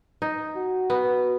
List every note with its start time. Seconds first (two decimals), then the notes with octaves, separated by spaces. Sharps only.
0.22 D#4
0.56 F#4
0.90 B3